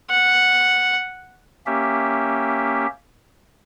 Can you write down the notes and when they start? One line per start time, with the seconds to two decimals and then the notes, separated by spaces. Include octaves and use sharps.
0.10 F#5
1.66 A#3 C#4 G4 E5